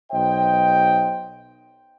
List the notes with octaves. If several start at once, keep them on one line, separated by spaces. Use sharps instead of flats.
B1 C5 D#5 G5